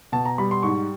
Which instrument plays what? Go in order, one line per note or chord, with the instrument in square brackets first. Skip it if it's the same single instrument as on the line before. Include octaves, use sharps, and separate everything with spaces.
[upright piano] B2 A5
A#5
G3 B5
C6
G#2 C#6